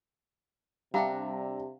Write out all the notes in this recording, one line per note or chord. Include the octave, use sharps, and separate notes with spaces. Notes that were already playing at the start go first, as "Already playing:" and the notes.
C3 G3 D4 E5 F5 G5 A#5